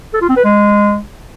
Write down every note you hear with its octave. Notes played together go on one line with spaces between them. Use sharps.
A4
F4
C4
B4
G#3